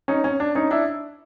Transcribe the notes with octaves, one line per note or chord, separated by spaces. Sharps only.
C#4 D#4
C#4
D4
C#4 D#4
D4 E4